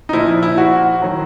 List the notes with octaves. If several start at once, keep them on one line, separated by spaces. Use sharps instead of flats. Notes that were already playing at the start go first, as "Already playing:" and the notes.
D#4
A#2 F3 E4
E4
F#4
D#3 F#3